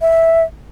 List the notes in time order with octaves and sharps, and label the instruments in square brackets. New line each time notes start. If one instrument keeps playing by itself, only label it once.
[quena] E5